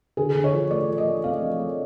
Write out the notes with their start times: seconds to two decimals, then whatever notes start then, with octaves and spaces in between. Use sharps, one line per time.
0.17 D3 G#4
0.35 D3
0.44 C#5
0.53 F3
0.71 A3 D5
0.89 F3
0.98 D#5
1.07 A3
1.24 C4 F5
1.41 F3
1.59 A3